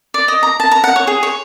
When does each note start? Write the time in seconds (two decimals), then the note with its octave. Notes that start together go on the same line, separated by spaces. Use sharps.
0.14 D5
0.28 D#5
0.43 A#5
0.60 A5
0.71 A#5
0.84 F#5
0.96 C#5
1.07 G#4
1.23 C#5